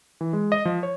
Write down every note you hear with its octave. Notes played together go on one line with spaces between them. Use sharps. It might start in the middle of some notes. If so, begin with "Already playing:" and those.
E3
G#3
D#5
F3
C#5